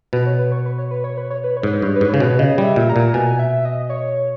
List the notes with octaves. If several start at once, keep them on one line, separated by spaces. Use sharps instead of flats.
B2 B4
C#5
B4
C#5
B4
C#5
B4
C#5
B4
C#5
B4
C#5
G#2
B4
G2 C#5
B4
G#2
C#3 C#5
B2 B4
C#3 D#5
G3
E5
A#2
A#5
A#2
B2 G#5
E5
D#5
C#5